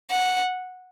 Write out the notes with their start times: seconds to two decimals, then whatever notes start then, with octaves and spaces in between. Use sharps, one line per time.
0.11 F#5